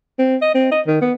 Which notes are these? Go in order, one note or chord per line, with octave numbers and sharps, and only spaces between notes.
C4
D#5
C4
D#5
D#3
B3